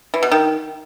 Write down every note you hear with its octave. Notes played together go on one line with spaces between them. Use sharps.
E3
B2
D#3